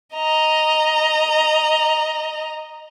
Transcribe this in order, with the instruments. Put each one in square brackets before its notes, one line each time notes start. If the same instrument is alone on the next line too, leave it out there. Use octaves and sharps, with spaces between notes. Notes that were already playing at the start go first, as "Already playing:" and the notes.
[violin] D#5 A#5